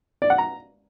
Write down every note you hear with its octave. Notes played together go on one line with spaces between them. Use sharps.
D5
F#5
A#5